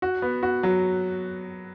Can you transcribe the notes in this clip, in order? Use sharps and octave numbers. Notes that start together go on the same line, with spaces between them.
F#4
B3
F#4
F#3